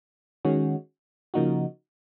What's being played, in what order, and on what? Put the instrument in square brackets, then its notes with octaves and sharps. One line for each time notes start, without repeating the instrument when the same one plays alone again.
[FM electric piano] D#3 G#3 C#4 F#4
C#3 F3 A#3 D#4 F#4